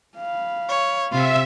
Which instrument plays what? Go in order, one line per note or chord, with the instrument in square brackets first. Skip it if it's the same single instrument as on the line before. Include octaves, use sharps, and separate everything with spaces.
[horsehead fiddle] F5 B5
[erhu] C#5
[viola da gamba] C3 [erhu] F4 [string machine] E5